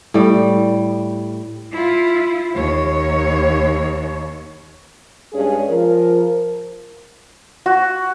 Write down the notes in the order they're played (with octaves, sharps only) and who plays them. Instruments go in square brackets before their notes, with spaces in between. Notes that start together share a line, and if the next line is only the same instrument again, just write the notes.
[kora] A2 G3
[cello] E4 F4
D#2 C#5
[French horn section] G2 G#3 C#4 G#4
F3 A#4
[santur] F#4